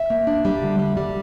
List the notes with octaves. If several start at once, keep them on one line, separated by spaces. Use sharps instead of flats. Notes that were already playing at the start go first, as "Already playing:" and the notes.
Already playing: E5
A#3
D4
G3
D3
G3
G3